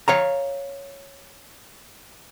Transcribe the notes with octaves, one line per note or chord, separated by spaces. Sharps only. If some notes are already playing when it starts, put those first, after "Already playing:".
C#5 F5 A#5